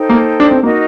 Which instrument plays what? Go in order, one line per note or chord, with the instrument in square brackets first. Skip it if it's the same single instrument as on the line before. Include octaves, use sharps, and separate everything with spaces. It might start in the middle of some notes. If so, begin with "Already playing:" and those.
Already playing: [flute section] D#4 A4 C5 G5
[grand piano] A#3
D4
C4
[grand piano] A#3 [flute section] D#4 F#4 A#4 D#5